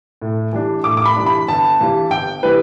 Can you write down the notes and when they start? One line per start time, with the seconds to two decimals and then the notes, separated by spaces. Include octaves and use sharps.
0.22 A2
0.53 E3 G3 D4
0.84 A2 D6
0.97 D6
1.06 B5
1.16 E3 G3 D4
1.26 B5
1.48 G1 A5
1.80 G2 E3 G3 E4
2.11 G1 G5
2.43 E3 G3 E4 B4